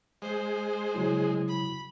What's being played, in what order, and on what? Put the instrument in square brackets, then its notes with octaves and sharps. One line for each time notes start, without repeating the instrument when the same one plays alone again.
[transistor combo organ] G#3 [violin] C5
[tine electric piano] C#3 F#3 E4
[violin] B5